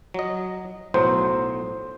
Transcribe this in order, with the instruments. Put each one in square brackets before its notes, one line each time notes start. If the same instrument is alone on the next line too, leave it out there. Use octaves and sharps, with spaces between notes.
[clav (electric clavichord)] F#3 D#5
[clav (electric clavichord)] B1 A2 F#3 [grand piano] C5